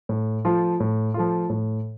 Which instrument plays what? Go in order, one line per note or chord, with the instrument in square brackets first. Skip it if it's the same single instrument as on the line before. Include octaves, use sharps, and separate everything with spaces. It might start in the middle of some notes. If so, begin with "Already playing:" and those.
[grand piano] A2
F3 A3 F4
A2
F3 A3 F4
A2